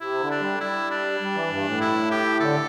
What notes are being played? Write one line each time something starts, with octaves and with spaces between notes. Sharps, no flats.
C3 E4
D3
D4
G3
G3 E4
D4
G3
E3
G2
A2
E4
G4
D3 A4